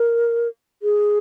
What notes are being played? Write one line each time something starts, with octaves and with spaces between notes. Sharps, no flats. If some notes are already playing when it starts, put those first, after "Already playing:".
Already playing: A#4
G#4